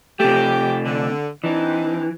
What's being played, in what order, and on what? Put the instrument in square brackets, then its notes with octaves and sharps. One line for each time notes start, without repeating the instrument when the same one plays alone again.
[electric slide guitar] C3 A3 [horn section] G4
[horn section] D3
[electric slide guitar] E3 [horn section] C4 D4 D#4